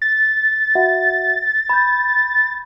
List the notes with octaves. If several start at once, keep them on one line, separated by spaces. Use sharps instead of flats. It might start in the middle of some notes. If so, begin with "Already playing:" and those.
A6
F#4 E5 F#5
B5 G6